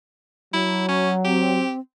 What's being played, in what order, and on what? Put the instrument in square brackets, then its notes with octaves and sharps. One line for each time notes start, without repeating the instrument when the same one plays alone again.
[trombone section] F#3 [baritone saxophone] E4
[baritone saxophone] C#4
[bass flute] C4 [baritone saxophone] G4